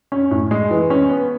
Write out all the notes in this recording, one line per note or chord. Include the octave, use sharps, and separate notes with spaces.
C#4
A2
G#3
E3
C#4
B3